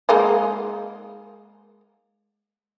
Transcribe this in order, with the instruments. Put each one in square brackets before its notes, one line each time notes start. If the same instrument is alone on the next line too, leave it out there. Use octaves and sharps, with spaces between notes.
[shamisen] G#3 A#3 D#4